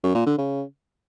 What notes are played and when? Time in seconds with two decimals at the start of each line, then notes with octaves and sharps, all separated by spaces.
0.04 F#2
0.15 A#2
0.27 D3
0.38 C#3